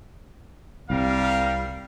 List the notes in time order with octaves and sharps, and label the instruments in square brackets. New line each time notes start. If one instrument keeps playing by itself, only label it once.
[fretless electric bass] C2 C3 [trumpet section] G3 A#4 F5